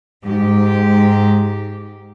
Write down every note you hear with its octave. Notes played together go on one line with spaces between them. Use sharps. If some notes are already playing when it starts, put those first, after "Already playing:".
G#2 G4